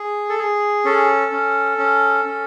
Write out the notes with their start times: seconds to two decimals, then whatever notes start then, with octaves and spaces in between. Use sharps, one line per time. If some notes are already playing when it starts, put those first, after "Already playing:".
Already playing: G#4
0.29 A4
0.39 G#4
0.85 C#4 A4
1.32 C#4
1.78 C#4
2.25 C#4